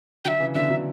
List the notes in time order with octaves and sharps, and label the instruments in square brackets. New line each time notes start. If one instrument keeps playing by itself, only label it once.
[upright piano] D3 F#3 [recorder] G5
[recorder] E5
[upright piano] C#3 E3
[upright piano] B2 D3 [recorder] E5
[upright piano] D3 F#3